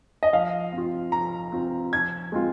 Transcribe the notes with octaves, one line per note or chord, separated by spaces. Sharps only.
D#5
F3 F5
C4
F4
F3 A#5
C4 F4
F3 G#6
G#3 C4 F4